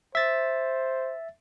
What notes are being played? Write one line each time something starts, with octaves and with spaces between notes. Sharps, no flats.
C5 E5 A6